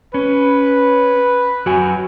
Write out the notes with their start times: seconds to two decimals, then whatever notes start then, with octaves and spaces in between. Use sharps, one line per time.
0.14 C#4 B4
1.66 F#3 F#4 G#5